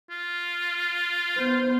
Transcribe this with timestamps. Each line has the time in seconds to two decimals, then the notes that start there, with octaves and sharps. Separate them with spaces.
0.11 F4
1.36 B3 C5